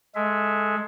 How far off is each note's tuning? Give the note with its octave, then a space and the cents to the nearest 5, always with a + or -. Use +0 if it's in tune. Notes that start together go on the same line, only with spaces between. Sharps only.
G#3 +10 A4 +0 E5 +0